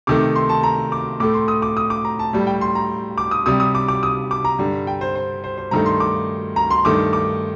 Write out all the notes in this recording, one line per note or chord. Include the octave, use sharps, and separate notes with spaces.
C3 D#3 A3 D6
C6
A5
A#5
D6
A2 A3 D6
C6
D#6
D6
D#6
D6
A#5
A5
A2 G3
G5
C6
A#5
D6
D#6
C3 G3 D#6
D#6
D6
D6
D#6
D6
A#5
G2 D3 G3
G5
C5
C5
C5
C5
G2 D#3 A3 A#5
C6
D6
A#5
C6
G2 D#3 A3 D6
D6